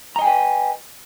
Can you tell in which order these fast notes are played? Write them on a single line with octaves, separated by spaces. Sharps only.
A#5 D#5 G#5 G5 B4